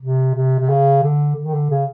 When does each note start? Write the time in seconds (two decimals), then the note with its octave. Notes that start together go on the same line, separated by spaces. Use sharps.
0.02 C3
0.35 C3
0.60 C3
0.69 C#3
1.03 D3
1.36 D3
1.45 D#3
1.54 D3
1.70 C#3